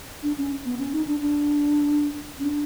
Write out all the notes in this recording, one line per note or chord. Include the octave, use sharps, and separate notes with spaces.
D4
C#4
B3
C#4
D#4
D4
D4
C#4
D4